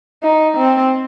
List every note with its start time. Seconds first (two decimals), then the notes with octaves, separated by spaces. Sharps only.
0.23 D#4
0.57 C4